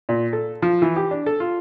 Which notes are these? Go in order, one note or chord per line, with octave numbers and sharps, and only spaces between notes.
A#2
A4
F3
E3
G4
D4
A4
F4